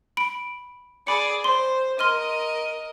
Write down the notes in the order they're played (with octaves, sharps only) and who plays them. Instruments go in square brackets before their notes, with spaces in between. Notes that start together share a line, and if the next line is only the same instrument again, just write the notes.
[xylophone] B5 D7
[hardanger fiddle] G#4 D5 [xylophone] B5 C#7
[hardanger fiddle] C5 [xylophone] C6
[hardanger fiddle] A#4 D#5 [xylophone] C6 F6 D#7